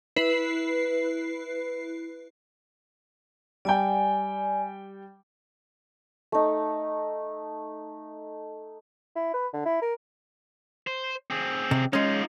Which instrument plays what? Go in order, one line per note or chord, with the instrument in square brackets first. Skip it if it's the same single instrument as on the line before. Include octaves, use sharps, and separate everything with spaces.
[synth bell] E4 B4 C7
[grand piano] G3 G5 [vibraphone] D5 G#5
[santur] A3 D#4
[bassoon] E4
B4
D3
E4
A#4
[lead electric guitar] C5
C4 G#4
[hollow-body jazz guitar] C3
[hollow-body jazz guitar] G#3 C#4 [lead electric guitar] D#4 F4